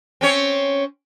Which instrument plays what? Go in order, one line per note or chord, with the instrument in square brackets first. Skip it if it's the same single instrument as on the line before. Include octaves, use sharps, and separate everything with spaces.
[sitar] C4 C#4 C#5